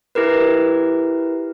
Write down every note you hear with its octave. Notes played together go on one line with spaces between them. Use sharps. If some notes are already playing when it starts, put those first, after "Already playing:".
E4 G4 A#4 B4